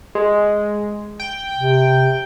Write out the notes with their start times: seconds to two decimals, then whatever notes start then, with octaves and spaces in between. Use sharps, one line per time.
0.15 G#3
1.20 G5
1.57 C3